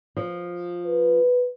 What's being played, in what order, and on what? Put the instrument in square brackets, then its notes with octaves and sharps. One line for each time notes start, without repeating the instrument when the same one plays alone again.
[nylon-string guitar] F3
[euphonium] B4